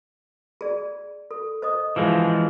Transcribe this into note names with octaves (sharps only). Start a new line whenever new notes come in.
G#4 D5
A4
C5 D#5 D#6
E3 F3 G#3 G#4